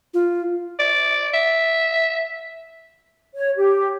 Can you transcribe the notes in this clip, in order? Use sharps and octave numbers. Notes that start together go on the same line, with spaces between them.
F4
D5
E5
C#5
G4